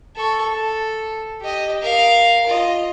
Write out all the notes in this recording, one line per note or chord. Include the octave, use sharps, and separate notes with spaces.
A4 C#6
A4
G4 D#5
A#4 F5
F4 D#5